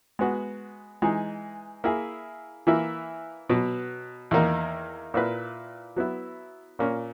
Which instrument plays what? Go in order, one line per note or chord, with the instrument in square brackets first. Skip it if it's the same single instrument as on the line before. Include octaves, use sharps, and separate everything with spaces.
[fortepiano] G#3 B3 F#4
E3 G#3 D#4
A#3 E4 G#4
E3 A#3 E4
B2 F#3 B3
E2 D#3 A#3 D#4 A#4
A#2 A#3 E4 B4
F#3 B3 E4
A#2 A#3 C#4